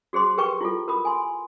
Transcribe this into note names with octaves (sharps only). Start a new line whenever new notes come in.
F#4 G#4 C5 C6 D6
G4 G#4 A#4 B4 G5 C#6
E4 F4 A4
A#4 B5 D#6
G#5 C6